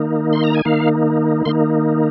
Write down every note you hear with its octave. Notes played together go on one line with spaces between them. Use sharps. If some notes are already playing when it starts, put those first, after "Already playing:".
Already playing: D#3 A#3 D#4
C6
A#5
G#5
D#3 A#3 D#4 F5
D#3 A#3 D#4 C6